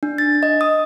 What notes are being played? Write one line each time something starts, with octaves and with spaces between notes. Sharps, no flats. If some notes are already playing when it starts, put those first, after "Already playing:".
D4
A6
D#5
D#6